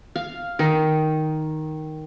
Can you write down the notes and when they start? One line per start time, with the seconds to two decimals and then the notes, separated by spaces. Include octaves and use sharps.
0.16 F5
0.59 D#3